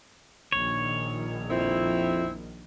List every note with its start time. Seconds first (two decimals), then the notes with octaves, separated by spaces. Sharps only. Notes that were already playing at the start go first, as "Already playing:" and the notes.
0.52 A#1 D#3 C#5
1.50 F2 C4 E4